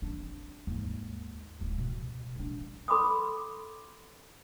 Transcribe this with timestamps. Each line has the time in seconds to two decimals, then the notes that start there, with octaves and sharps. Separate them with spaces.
0.02 C4 D4
0.67 G#1 D#2
1.59 D1 G#3
1.78 B2
2.36 C#2 D4
2.88 A4 B5 C6 D6 D#6